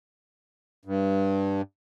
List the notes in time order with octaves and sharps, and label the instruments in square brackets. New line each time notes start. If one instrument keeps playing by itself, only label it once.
[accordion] G2